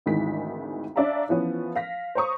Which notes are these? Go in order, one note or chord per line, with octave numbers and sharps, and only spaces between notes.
G#1 D2 D#3 E3 G#3 B6
D4 C#5 D5 E5 F5 A#5
E3 F3 B3 C#4
F5 A#6 B6
C5 C#5 A#5 C#6 D#6